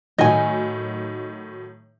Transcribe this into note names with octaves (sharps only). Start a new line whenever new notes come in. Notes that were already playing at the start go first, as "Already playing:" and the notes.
A2 D#3 F#3 D#5 G#5